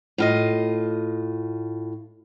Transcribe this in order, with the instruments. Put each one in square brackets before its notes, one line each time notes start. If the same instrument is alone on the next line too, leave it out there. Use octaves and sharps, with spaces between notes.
[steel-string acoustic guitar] A2 F4 D#5